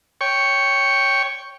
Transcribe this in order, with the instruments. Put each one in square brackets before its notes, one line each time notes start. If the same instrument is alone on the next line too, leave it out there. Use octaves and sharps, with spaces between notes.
[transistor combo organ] C#5 G5 C#6